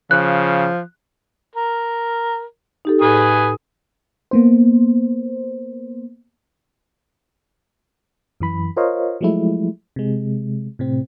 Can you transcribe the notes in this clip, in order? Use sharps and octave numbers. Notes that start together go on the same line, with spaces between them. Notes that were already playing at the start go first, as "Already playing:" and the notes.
C#3 F3 F#6
A#4
D#4 G4 A4
A2 B4 G#5 D#6
A#3 B3 C5
F#2 E3 B5
F4 A#4 C5 C#5 D#5 F5
F3 F#3 G#3 A3 E4
C3 G#3
A2 C3 C4